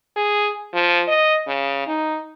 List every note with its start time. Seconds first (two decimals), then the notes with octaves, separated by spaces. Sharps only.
0.16 G#4
0.74 F3
1.08 D#5
1.47 C#3
1.87 D#4